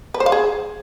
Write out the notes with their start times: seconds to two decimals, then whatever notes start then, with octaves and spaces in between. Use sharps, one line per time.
0.14 B4
0.20 C5
0.26 F5
0.32 G#4